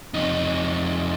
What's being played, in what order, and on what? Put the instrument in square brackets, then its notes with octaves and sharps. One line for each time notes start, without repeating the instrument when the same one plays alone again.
[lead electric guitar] F2 D#4